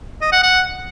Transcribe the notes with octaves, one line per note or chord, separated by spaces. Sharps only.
D#5
F#5
F#5